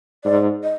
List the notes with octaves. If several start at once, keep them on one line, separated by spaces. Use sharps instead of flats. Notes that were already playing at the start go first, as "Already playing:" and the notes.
G#2 D5
D#5